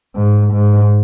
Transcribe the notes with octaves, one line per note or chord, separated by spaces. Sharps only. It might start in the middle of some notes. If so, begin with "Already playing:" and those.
G#2
G#2